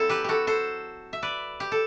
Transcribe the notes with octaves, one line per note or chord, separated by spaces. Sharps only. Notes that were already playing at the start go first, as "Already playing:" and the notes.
Already playing: F#3 C4 E4 A4
G4 B4
F#4 G4 A4
A4 C5
E5
B4 D5
G4
A4